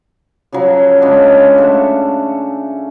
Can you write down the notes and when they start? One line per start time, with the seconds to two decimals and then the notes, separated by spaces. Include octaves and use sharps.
0.52 C#3 F3 F#3
1.01 C#3 G#3 C#4 D4
1.58 A3 E5 F#5